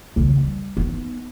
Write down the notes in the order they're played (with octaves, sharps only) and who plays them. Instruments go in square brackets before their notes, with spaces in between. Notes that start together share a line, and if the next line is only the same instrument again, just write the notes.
[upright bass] D#2 C#3
G3
B3 D#4